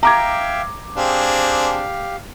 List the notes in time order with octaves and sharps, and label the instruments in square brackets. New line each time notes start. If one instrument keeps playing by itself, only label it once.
[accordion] E5 F5 G5 [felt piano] A#5 D6 G#6
[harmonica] C4 D4 G#4 [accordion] G4 F5